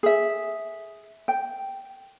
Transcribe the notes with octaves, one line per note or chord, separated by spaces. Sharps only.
G#4 E5
G5